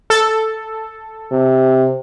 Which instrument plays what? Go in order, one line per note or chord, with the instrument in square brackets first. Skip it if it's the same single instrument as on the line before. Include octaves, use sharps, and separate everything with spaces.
[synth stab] A4
[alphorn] C3